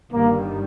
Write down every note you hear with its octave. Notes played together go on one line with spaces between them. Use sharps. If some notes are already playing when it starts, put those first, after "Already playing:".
G1 G2 D#3 G3 A#3